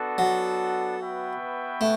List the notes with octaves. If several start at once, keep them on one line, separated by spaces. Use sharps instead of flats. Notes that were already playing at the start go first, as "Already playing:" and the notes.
Already playing: B3 D4 F#4 A4
F#3
B3 F#4 B4 E5 G5
A3